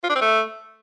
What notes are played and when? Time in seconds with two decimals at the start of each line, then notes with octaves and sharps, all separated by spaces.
0.04 F4
0.10 D4
0.16 C4
0.21 A3